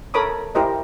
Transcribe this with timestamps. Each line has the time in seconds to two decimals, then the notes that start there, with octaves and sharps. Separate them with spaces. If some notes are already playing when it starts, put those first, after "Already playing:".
0.14 A4 A#4 C#5 B5 D6 D#6
0.55 E4 G4 A#4 C5 D#5